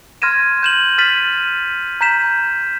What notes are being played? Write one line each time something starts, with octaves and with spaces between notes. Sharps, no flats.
C6 F6 G#6 A#6 D#7 E7
G6 E7 F#7
F6 A6 B6 D#7 F#7
A#5 G6 B6 E7